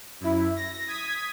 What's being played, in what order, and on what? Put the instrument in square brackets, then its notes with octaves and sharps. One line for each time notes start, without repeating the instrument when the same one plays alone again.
[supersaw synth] F#2 E4
A#6
D#6 G#6 B6